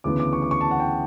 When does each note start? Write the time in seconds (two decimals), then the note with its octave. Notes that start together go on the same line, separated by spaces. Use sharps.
0.04 D2 C#3 E3 B3 D6
0.20 D6
0.33 C#6
0.42 D6
0.51 C#6
0.61 A5
0.71 F#5
0.80 G5